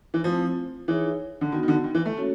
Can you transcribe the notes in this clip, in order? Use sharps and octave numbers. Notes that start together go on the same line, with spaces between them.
E3
F3 A3 C4 E4
E3 D#4 G#4 C#5 E5
D3
D#3 B3 D#4 F#4
D#3
D3
D#3
E3
A3
A#3 C#4 F#4 A4 C#5